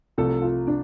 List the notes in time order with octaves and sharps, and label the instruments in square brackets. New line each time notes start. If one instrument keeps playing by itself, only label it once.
[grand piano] C2 C3 F3 A3 [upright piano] A4
[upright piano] F4
D4